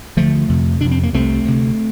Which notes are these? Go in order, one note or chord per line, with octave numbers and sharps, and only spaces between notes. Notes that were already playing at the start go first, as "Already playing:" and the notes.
D2 D3 F3 A3
F2 C3
F2 C3 D4
C4
A#3
C2 C3 A3 C4
D2 C3